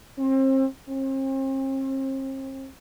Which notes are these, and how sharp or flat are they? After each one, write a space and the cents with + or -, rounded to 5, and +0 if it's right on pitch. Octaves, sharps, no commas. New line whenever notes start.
C4 +35
C4 +40